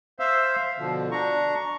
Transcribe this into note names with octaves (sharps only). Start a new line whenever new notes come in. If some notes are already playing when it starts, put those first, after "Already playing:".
C5 E5 F5 E6
B2 D3 F3
D4 A#5 C#6